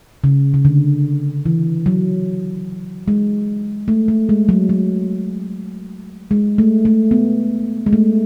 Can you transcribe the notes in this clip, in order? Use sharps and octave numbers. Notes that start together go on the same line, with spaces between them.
C#3
C#3
D3
E3
F#3
G#3
A3
A3
G#3
F#3
F#3
G#3
A3
A3
B3
G#3
A3